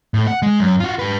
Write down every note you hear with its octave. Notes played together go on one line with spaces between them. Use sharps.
A2
F#5
G#3
F#2
F4 F#4
G4 B4